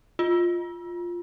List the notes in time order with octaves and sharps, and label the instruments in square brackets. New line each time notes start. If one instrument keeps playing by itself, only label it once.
[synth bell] F4